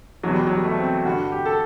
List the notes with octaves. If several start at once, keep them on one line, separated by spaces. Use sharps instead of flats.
E2 B2 F#3
G3
F#3
G3
A3
C4
G2 D3 F#4
G4
A4